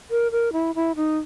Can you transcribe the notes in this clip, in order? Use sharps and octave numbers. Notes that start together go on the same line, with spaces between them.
A#4
A#4
E4
E4
D#4